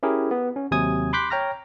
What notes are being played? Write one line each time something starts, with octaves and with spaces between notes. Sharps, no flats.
C#4 E4 G4 G#4 A#4
B3
C#4
D#2 C3 F#3 G#5 D#6 G#6
B5 C6 D6 F#6 G6 B6
C#5 G5 A#5 F6 A#6